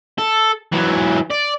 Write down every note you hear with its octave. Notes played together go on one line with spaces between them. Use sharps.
A4
E3 F#3
D5